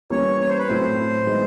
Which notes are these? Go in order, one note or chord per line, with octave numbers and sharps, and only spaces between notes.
E3 G3 A#3 C#4 C#5
C#5
C5
B4
A2 F#3 A3 C4 C5
E3 G#3 B3 D#4